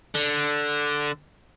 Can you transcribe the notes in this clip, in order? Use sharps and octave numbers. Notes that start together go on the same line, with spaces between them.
D3